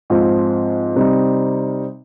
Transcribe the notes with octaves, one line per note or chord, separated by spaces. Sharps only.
G#2 F3 C4 F4
C3 G3 C4 D#4